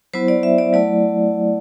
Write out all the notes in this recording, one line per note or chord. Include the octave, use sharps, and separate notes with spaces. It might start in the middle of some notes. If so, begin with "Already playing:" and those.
F#3 B3 E4 C5
D5
E5
D5
F#3 A3 E4 D5